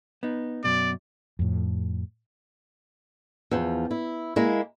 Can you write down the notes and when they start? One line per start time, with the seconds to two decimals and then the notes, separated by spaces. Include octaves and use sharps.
0.23 B3 D#4
0.64 F#2 B2 D5
1.39 F2 A2
3.51 E2 F3
3.91 E4
4.36 G#3 A#3 E4